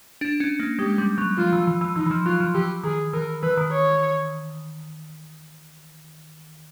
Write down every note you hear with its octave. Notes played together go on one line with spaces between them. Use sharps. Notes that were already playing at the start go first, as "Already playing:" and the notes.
D4
C#4
A#3
G#3 G4
G3
F#3
F3 F4
E3
E3
E3
E3 D#4
E3
F3
F#3 F4
F3
E3 G4
D#3 G#4
E3 A#4
E3 B4
D#3
C#5